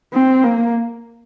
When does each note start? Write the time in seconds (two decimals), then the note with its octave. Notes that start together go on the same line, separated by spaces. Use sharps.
0.13 C4
0.44 A#3